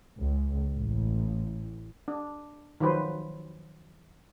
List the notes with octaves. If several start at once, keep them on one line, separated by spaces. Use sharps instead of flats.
C#2
A1
D4
D#3 F3 F#3 B4 C5